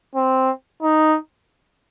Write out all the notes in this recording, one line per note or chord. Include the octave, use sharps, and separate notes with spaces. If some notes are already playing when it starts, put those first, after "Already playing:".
C4
D#4